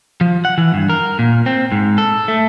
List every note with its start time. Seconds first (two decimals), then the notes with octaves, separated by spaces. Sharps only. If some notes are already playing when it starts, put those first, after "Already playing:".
0.21 F3
0.45 F#5
0.58 E3
0.74 G2
0.90 A#4
1.19 A#2
1.46 C4
1.72 G#2
1.98 A4
2.28 A3